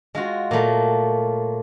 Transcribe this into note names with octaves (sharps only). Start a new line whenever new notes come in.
G#3 F4 F#4
A#2 F#3 A3 A#3